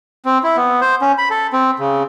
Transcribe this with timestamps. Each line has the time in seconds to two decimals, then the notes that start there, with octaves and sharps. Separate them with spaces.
0.26 C4
0.44 E4
0.57 B3
0.81 C5
1.02 C#4
1.18 B5
1.30 A4
1.53 C4
1.79 C#3